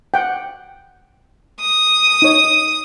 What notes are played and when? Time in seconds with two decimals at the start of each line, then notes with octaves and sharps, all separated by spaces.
0.14 F#5 G5
1.61 D#6
2.22 D#4 C#5